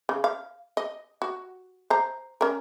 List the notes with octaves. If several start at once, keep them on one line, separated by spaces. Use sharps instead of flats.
C#3
F5
D#5
F#4
C5 A#5
C#4 A#4